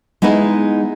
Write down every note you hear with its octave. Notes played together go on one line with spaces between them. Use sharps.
G#3 B3 D#4 E4 G#4